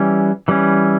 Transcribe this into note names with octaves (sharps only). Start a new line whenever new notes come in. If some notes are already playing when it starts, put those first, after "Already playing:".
Already playing: E3 G3 C#4
E3 G3 C#4